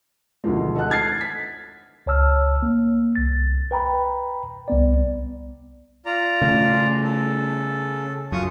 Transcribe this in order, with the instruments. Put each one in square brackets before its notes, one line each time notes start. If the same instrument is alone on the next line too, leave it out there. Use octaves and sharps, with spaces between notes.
[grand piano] G#1 D2 B2 E3 F3 G#3
A4 D#5 F#5 A5 F#6
F6 G#6 A6 C7
B6
[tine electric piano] C#2 C#5 A5 E6 F6
A#3
C2 A6
B4 G5 A#5 B5
C2 B3 D5
[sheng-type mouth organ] F4 D5 A#5
[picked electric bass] C#3 A3
[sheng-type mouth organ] A4
[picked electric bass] F#2 [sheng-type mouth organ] F4 C#6 D#6